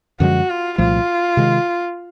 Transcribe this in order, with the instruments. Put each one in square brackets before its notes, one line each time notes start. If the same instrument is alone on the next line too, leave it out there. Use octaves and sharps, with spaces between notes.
[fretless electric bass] F#2 D3 F3 G#3 [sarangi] F#4
[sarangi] F4
[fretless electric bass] C2 A#2 F3 A3 [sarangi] F4
[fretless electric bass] C3 D#3 G#3